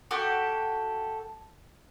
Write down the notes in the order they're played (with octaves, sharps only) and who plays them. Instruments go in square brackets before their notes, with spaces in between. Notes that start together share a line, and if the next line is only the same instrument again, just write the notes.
[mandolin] F#4 G4 A4